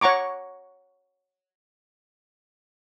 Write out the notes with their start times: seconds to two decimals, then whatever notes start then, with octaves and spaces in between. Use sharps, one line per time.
0.01 C#5 F#5 A#5 C#6 D6